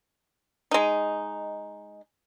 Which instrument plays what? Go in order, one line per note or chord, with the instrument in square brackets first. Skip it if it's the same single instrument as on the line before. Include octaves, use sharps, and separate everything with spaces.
[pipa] G#3 D#4